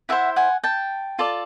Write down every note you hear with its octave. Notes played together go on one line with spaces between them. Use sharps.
E4 G#4 C5 E5 F#5
F#5 G#5
G5 A5
F4 A4 D5